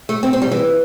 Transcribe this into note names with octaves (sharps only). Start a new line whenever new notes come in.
A3
C4
C4
G3
E3